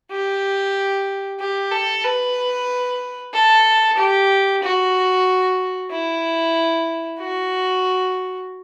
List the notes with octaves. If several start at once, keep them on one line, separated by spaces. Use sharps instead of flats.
G4
G4
A4
B4
A4
G4
F#4
E4
F#4